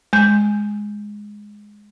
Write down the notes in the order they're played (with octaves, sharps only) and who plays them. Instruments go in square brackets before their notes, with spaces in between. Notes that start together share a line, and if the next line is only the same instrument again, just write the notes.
[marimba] G#3 G6